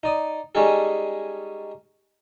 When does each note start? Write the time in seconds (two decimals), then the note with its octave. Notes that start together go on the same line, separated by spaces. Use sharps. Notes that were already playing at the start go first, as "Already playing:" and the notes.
0.03 D#4 D5 D#6
0.55 G3 G#3 C#4 D#4 G#4 A4